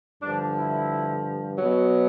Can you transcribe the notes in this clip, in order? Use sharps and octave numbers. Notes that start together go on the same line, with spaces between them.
G2 D3 F3 D4
E4
B2 F#3